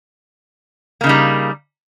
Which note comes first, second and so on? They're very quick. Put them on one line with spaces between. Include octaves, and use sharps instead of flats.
A#3 C#3 D#4 G3